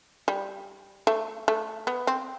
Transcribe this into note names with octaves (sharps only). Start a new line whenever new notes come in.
G3
A3
A3
B3
C4